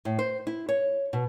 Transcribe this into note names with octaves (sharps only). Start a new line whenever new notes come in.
A2
C5
E4
C#5
B2